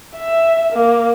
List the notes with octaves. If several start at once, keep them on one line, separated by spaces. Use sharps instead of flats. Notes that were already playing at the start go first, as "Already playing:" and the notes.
E5
A#3